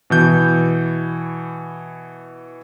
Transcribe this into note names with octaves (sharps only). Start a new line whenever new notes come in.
B2 E3 G6